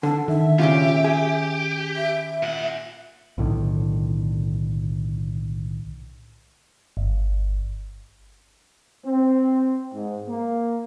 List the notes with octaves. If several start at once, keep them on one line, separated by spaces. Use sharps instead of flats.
D3 A4 A5
D#3 E5
A#2 C#3 C#4 F4 G4
G#4
E5
A#2 F#5
B1 A2 D3 D#3
G1
C4
G#2
A#3